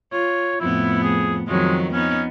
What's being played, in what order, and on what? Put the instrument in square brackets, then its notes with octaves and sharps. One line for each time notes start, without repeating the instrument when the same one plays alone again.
[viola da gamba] F4 [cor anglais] C#5
[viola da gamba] F2 A2 B3 [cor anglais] E4
[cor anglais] G#4
[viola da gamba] F2 D#3 F#3 [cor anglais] G#3
[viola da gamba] B3 D#4 [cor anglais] C#4